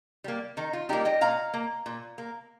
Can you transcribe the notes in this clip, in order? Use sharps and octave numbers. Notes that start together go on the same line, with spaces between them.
G3 A#3
D#3 D#4
F4
G3 A#3 D#4 G4
D#5 G5
A#2 F5 A#5
A#3
A#2
A#3